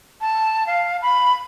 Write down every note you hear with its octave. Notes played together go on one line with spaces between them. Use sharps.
A5
F5
B5